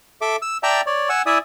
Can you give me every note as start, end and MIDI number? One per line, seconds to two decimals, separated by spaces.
0.21 0.36 69
0.21 0.36 76
0.21 0.36 86
0.42 0.57 88
0.63 0.81 74
0.63 0.81 76
0.63 0.81 79
0.63 0.81 81
0.63 0.81 82
0.63 0.81 88
0.86 1.09 73
0.86 1.09 74
1.09 1.22 78
1.09 1.22 80
1.09 1.22 88
1.26 1.38 64
1.26 1.38 74
1.26 1.38 76
1.26 1.38 80
1.26 1.38 87